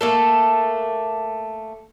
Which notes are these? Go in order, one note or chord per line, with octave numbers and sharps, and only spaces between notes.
A3 A#3 A4